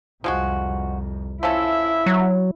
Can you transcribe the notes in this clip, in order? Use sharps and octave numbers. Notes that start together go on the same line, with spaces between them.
C2 F2 F3 G#3 F#4
F3 C#4 E4 A4 E5
F#3